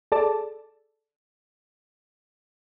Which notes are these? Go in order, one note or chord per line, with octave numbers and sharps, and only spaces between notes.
G#4 A4 D5 A5